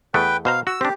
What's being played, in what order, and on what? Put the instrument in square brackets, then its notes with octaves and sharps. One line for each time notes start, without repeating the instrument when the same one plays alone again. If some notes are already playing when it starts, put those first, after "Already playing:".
[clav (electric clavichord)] E2 A3 B3 [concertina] B4 G5
[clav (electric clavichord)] B2 C5 A#5 [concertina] F5
[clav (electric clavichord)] F#4 [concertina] E6
[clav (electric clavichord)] C4 D4 [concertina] G4